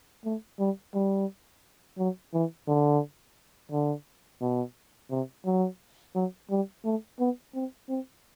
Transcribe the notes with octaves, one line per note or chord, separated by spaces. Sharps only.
A3
G3
G3
F#3
E3
D3
D3
B2
C3
F#3
F#3
G3
A3
B3
C4
C4